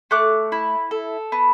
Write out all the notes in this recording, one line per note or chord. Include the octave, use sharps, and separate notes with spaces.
A3 D6 F#6
E4
A4
B3